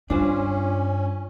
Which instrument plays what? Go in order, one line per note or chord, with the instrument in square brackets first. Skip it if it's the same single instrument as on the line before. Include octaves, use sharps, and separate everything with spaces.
[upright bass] G2 [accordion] C#4 [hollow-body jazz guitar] D4 F4 C5